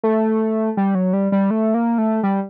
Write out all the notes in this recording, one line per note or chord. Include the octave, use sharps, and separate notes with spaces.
A3
G3
F#3
G3
G3
A3
A#3
A3
G3